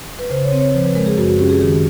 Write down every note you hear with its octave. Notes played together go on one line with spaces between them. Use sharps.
B4
C#3 C5
C#5
C4
C#5
F3 C5
B4
G#3 A#4
G#4
F#2 F#4
F#4
C#4 G4
G#4
D#3 G#4